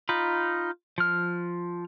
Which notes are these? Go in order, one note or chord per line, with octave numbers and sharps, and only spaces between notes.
D#4 F4 B5
F3 F6